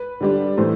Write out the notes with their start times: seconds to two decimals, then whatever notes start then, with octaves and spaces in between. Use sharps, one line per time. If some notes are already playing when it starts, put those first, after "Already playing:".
Already playing: B4
0.20 D3 G3 D4
0.57 A2 E3 A3 C5